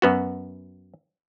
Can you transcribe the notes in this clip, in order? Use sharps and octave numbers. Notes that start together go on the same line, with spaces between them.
F#2 B3 F#4